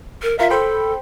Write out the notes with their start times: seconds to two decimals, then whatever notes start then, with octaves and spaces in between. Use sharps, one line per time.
0.23 A#4
0.39 F4 A#4 E5 F5
0.50 A4 C5 G5 B5